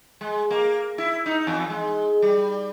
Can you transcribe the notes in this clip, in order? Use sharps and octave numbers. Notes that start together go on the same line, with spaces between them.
G#3
A#3
E4
D#4
E2
G#3
G3